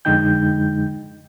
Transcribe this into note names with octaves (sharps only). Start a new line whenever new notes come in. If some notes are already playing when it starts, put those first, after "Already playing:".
F2 D3 G#3 D#4 G5 G6